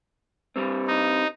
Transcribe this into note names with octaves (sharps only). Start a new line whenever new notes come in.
G2 G3 C4
D#4